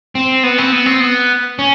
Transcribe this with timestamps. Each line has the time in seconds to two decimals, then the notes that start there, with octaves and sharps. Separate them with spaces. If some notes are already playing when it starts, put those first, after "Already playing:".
0.15 C4
0.43 B3
0.58 C4
0.72 B3
0.86 C4
1.00 B3
1.59 C#4